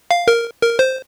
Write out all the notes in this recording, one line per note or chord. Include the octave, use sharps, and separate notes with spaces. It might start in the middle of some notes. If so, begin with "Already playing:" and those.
F5
A#4
A#4
C5